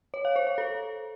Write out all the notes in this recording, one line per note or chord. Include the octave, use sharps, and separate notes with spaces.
C#5
F5
C5
F5
A4